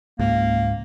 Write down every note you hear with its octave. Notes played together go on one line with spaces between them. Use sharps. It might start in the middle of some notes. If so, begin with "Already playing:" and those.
C#2 G#2 A#3